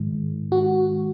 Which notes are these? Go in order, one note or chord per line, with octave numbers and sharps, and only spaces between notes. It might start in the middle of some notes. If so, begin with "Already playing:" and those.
Already playing: G#2 D#3 G#3
F#4